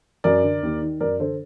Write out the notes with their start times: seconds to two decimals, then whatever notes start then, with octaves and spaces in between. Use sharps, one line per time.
0.24 F#2 A#4 D5
0.43 D3
0.63 D#2
0.82 D#3
1.00 F#2 A#4 D5
1.19 D3 A4 C5